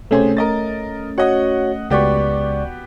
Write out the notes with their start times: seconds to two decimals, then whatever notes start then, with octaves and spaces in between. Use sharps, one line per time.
0.11 C3 A3 C#4 G#4 C5
0.37 A#4 D#5 A6
1.18 F#4 C#5 D#5 F#5
1.90 C#2 B3 F#4 G4 D5 C#6